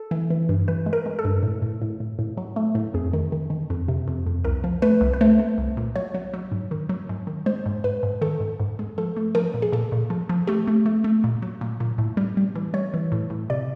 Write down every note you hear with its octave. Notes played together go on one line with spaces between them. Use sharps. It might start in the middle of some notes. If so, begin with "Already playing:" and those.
Already playing: A4
E3
E3
G2
E3 B4
G#3
A#4
G#3
A4
G2
A2
A2
A2
A2
A2
F#3
A3
A2
F2 G#4
D#3
D#3
D#3
F2
C3
F2
F2
C2 A#4
F3
A3 B4
C2
B4
A3 C5
A3
C2
A#2
F#3 C#5
F#3
F#3
G#2
D#3
F#3
G#2
D#3
G#3 C5
G#2
G#2 B4
G#2
D#3 A4
G#2
G#2
G#3
F3 A4
A3
F3 A#4
A#2
G#4
A#2 A4
A#2
F3
F3
A3 G4
A3
A3
A3
A#2
F#3
A#2
A#2
A2
G3
G3
E3
G3 C#5
E3
A2
A2
C3 D5